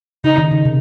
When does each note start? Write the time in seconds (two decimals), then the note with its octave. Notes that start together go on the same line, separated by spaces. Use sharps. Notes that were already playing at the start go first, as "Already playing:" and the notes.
0.24 C#3 D#4
0.38 D#3
0.51 C#3
0.65 C3